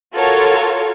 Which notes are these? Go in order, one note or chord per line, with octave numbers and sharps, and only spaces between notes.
F4 F#4 A4 A#4 C#5